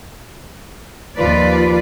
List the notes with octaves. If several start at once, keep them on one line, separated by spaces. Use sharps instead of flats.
D#2 F3 F4 B4 D5